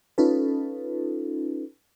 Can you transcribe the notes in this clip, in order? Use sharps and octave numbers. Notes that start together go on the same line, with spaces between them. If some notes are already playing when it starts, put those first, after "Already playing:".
C#4 D#4 F4 A4 B4